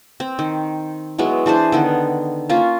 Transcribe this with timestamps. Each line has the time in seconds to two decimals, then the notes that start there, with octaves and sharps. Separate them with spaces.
0.20 C4
0.39 D#3
1.18 F#3 G#3 B3 E4
1.46 E3 D4 G#4 C5
1.72 D3 D#3 B3
2.49 A#3 C#4 F4